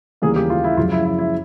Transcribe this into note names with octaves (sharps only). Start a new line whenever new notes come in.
D#2 C#3 E3 G3 A#3 G#4
G4
F4
E4
F#2 C#3 F3 F4
E4
E4
E4